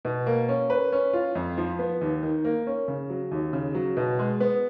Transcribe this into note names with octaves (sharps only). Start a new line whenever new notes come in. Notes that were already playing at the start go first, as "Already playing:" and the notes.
B2
A#3
C#4
B4
C#4
F4
F2
F3
B3
D#2
D#3
A#3
C#4
C#3
F#3
D#2
C#3
F#3
B2
G#3
B3